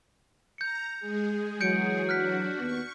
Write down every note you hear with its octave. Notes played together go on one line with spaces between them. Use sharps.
A#5 G6 C#7
G#3 G#4
E3 F#3 G6 C#7 D7
D4 F#4 F6 F#6 B6
D#2 B3 C#6